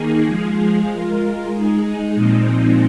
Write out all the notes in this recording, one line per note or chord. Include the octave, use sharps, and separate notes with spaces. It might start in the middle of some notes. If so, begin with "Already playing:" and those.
Already playing: D#3 A#3 D#4 G#4
F3 G#3 F4 G#4
G#3 F4 A#4
G#3 D#4 G#4
A#2 F3 G#3 C4 D#4